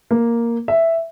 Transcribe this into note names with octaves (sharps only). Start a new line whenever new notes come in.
A#3
E5